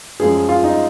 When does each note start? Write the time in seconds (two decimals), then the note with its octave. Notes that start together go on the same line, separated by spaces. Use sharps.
0.20 F#2 F3 G#3 G#4
0.49 F4
0.64 D#4